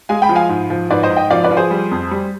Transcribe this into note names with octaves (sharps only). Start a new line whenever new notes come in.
G#3 F5 G#5
G5 B5
F3
F5 G#5
G#2
F3
G#2 B4 D5
C5 D#5
G#2
D#5 G5
F3 D5 F5
B4 D5
F3
G#4 C5
G3
F2
G3